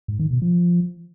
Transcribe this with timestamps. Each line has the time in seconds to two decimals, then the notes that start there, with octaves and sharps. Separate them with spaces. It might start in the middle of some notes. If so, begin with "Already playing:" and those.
0.08 G#2
0.19 D#3
0.31 B2
0.42 F3